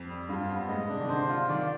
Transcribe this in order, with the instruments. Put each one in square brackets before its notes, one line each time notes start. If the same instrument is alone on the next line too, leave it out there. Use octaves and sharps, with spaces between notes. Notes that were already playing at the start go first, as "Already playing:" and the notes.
Already playing: [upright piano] F2
[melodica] G3
[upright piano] G2 [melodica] F4
[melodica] B3
[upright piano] G#2 [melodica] D#5
[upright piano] C3 [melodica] D4
[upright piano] D#3
[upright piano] D3 [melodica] C5
[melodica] F4
[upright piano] D#3 [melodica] D5